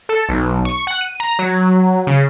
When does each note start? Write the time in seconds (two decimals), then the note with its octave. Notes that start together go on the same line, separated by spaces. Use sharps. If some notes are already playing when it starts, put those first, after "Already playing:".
0.09 A4
0.29 B1
0.65 C#6
0.87 F#5
1.01 D#7
1.20 A#5
1.39 F#3
2.07 C#3